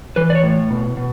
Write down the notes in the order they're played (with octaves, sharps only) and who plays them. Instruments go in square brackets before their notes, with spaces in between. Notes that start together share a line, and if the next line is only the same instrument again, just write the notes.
[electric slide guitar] E3 B4
D5
C#5
A2
B2
B2